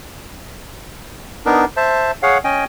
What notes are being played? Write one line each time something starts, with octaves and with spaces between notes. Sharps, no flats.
B3 D4 D#4 A#4
C5 E5 A5
G#4 C#5 F5 F#5
C#4 D#5 G5 G#5